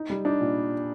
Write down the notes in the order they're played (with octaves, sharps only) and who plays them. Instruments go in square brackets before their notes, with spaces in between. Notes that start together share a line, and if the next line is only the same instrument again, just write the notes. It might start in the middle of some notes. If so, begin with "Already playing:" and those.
Already playing: [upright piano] D#4
G3
[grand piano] D4 [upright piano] D#4
[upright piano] A#2